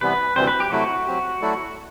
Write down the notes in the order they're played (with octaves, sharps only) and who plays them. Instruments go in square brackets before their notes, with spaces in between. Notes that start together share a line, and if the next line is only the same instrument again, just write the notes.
[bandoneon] C3 E3 G3 B3 [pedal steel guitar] B4
[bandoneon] D2 C3 E3 G3 C4 [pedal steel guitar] C5
[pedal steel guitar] B4
G4
[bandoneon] C3 F#3 A3 E4 [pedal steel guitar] F#4
[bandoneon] F#3 C4 G4
F#3 A3 E4 A4 D5